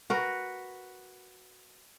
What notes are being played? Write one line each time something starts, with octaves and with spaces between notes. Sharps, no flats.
F#4 A#4 B4